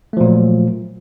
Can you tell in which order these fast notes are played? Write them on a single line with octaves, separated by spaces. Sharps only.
A3 F3 A#2 F#3